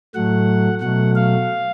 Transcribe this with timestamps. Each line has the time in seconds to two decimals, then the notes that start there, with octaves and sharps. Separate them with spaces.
0.15 A2 F#3 A3 F#5
0.81 B2 F#3 A3 F#5
1.15 F5